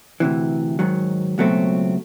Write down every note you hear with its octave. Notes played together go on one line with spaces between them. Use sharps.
D2 C3 E3
G#2 D#3 F#3
C#2 B2 F#3 A3 C4